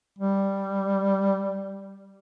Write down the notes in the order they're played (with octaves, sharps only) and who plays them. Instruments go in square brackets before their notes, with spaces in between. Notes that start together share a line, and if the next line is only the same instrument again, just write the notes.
[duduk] G3